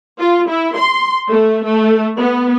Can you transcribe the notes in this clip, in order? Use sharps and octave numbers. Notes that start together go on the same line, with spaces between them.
F4
E4
C6
A3
A3
B3